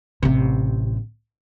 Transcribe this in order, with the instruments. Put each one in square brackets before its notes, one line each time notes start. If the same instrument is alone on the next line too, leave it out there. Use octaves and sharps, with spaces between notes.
[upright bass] A1 C3